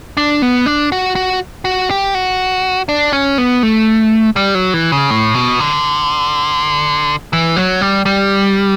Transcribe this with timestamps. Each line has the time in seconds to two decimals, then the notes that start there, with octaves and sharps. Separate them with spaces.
0.17 D4
0.42 B3
0.66 D4
0.92 F#4
1.15 F#4
1.65 F#4
1.90 G4
2.14 F#4
2.89 D4
3.13 C#4
3.38 B3
3.63 A3
4.36 G3
4.55 F#3
4.74 E3
4.92 C#3
5.10 A2
5.34 B2
5.60 D3
7.33 E3
7.56 F#3
7.81 G3
8.06 G3